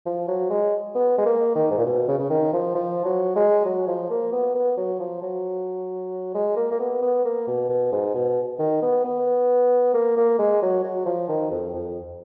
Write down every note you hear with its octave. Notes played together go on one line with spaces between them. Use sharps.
F3
F#3
G#3
B3
G#3
A#3
D#3
G#2
A#2
B2
C#3
C#3
D#3
F3
F3
F#3
G#3
F#3
F3
A#3
B3
B3
F#3
F3
F#3
G#3
A#3
A#3
B3
B3
A#3
B2
B2
G#2
B2
D#3
B3
B3
A#3
A#3
G#3
F#3
F#3
F3
D#3
F2
F2